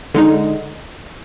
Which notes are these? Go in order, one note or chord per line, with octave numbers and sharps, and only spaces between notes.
D3 G#3 D#4